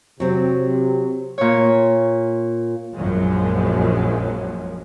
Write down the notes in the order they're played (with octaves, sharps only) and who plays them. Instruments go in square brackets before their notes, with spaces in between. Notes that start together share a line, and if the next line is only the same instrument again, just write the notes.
[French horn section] C3 [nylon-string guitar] F#3 C4
[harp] A#2 C#5
[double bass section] A#1 F#2 F3 F#3 G#3